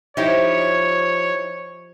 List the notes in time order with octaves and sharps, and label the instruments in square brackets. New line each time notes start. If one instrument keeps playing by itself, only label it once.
[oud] F3 [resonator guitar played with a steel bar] D#4 E4 G4 [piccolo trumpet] C#5